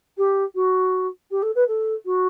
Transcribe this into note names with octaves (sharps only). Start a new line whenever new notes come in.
G4
F#4
G4
A4
B4
A4
F#4